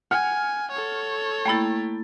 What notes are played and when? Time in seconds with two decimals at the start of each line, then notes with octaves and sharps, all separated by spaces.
0.11 F#5 G#5 F6 C#7
0.71 A4 C#5
1.46 A3 A#3 E4 G5 B5 A6